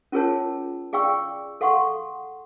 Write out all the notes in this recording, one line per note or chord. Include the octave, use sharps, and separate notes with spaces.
C#4 F4 G#4 A#4 C#5 A5
G#4 D5 F5 G5 C#6 E6
A4 F5 F#5 C6 C#6